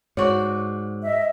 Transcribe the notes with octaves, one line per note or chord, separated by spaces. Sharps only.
G#2 F#4 C#5 D5 C#6
D#5 E5